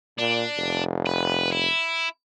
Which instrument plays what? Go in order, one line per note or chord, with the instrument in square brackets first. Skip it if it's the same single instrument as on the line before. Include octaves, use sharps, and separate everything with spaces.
[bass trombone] A#2 [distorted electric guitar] D4
[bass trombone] F1
[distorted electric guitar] B4
E4